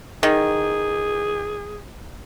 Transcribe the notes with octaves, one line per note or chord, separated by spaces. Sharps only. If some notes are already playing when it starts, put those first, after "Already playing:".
D#3 G#4